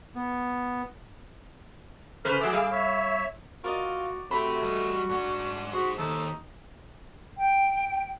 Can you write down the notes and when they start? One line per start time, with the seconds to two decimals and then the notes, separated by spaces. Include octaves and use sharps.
0.15 B3
2.25 C#3 B4 C5 F6
2.41 F#3 A3 G#4 D6 E6
2.53 G3 F5
2.71 C#5 E5
3.64 F4 F#4 A#4 D5 D#5
4.31 A3 F#4 G4 C5 B5
4.63 G3 D#5
5.09 G#2 D4 F#5
5.73 D#4 F#4 G#4 C5
5.98 D#2 D#4 A4
7.38 G5